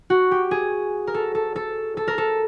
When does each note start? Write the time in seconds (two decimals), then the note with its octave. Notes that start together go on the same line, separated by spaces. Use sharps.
0.10 F#4
0.31 G4
0.51 G#4
1.07 A#4
1.14 A4
1.35 A4
1.56 A4
1.97 A4
2.08 A#4
2.18 A4